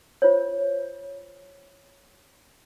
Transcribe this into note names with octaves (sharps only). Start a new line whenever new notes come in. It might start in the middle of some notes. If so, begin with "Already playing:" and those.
F4 C5 C#5